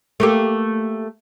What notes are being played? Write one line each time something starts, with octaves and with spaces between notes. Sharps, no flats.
A3 A#3 G4